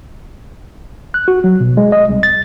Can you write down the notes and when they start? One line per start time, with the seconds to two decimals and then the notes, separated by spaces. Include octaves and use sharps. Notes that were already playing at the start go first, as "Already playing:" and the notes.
1.14 F#6
1.28 F#4
1.44 F#3
1.60 B2
1.77 G#3
1.92 D#5
2.09 C2
2.23 A6